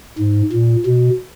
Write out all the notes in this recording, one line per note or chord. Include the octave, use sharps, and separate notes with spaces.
G#2
A#2
B2